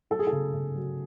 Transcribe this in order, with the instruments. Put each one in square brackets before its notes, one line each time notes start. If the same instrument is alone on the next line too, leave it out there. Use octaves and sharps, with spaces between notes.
[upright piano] F#3 A4
G#4
A4
C#3
C#3
F#3